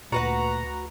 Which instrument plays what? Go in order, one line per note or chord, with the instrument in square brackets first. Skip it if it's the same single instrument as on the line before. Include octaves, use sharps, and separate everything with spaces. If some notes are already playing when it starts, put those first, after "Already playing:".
[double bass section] D2 [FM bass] A#2 [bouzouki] F#4 B4 F#5 [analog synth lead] A#5